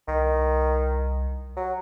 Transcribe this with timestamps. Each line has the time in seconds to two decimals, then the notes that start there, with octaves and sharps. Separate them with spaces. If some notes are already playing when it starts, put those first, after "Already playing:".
0.08 C2 D#3
1.57 F#3